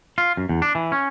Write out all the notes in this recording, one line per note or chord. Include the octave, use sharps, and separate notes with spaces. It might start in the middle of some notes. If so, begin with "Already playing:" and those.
F4
F#2
E2
D4
E3
C#4